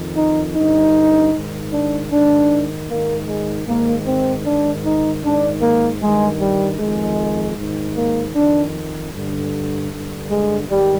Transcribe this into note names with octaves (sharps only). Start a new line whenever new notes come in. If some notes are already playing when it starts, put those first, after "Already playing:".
Already playing: F2 D#3
D#4
G2 D3 D#4
G#2 D#3
D4
G#2 D#3 D4
G#2 D#3 A#3
G#3
G#2 D#3 A#3
C4
G#2 D#3 D4
D#4
G#2 D#3 D4
A#3
G2 D#3 G#3
G3
F2 D#3 G#3
G#2 D#3
A#3
F2 D#3 D4
G2 D3
G2 D3
G#3
G#2 D#3 G3